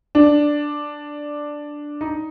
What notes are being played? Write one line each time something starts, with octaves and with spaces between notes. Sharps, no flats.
D4
D#4